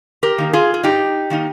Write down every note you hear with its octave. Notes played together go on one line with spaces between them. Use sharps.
G4 A#4
D#3 A#3 D#4
F4 G#4
G#4
G2 D#4 G4
D#3 A#3 D#4